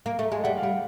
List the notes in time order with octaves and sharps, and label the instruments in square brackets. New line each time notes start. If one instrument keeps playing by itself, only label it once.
[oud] A#3
A3
G#3
[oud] G3 [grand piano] F#5
[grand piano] F5
[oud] G3 [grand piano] F#5